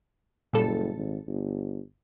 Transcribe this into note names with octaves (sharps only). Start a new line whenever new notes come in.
F#1 A#2 G3 A4
G#1
G1